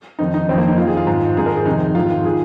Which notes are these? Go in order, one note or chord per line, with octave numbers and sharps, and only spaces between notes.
F2 D#3 D#4
D#4
F2 D#3 C4
A#3
D#4
F2 D#3 F4
G#4
F4
G#2 D#3
G#2 D#3 G#4
A#4
G#4
F2 C3 D#3 D#4
G#2 D#3 F4
F4
D#3 G#4